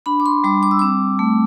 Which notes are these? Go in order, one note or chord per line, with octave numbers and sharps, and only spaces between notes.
D4 B5
D6
C6
G3 D6
D6
E6
C4 D6
A3